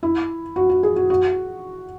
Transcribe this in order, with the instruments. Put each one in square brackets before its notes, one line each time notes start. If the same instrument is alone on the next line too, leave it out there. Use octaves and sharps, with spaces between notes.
[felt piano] E4
F#4
F#4
G#4
F#4
F#4